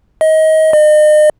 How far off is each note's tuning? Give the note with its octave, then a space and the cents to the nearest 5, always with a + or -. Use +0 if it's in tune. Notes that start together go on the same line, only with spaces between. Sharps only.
D#5 +25
D#5 -40